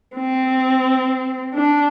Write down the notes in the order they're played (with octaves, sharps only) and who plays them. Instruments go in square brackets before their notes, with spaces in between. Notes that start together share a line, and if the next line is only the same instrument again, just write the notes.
[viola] C4
D4